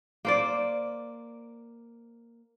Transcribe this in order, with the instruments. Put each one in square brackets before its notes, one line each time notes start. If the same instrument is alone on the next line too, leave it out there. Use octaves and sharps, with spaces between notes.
[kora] A#3 C5 D5